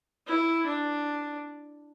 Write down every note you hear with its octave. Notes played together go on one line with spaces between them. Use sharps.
E4
D4